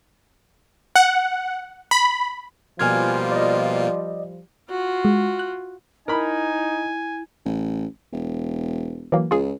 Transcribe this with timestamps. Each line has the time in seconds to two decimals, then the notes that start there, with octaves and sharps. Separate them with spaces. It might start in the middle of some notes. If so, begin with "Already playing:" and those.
0.96 F#5
1.91 B5
2.79 B2 F3 G3 A#3 F4 G#5 F6 G#6
3.32 D5 D#5
4.70 F4 F#4
5.05 G#3
5.39 F#6
6.08 D#4 E4 A#4 G#5 B5
7.45 A1
8.13 E1
9.12 E3 F#3 A#3
9.31 C#2 F4 G#4